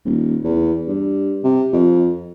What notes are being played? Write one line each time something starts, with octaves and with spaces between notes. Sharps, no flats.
D#1
E2
G2
C3
F2